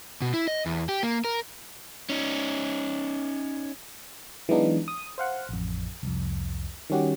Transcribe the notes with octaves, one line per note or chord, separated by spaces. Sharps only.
B2
E4
D#5
E2
G4
A#3
A#4
C#4 D#4
E3 F#3 G#3 B3 D4 D#4
D#6
C5 F5 F#5
A1 F2
C2 F2
D#3 G3 C#4 F#4 G4